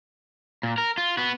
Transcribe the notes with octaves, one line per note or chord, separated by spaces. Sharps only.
A#2
A#4
F4
B3 F#4